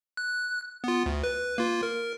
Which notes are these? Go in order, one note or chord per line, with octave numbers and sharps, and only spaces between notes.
F#6
B3 F4
D2
B4
A#3 F4
A#4